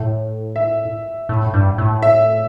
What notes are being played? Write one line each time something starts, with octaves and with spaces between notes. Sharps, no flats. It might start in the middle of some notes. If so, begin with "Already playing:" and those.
Already playing: A2
E5
A2
G2
A2
E5